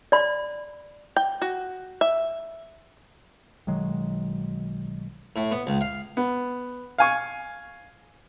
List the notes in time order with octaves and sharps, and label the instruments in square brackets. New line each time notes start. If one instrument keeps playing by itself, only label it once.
[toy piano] D5 B5
[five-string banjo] G5
F#4
E5
[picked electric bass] B1 D#3 F#3 G#3
[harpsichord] A2
B3
C#2
F5
[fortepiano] B3
F5 G#5 C#6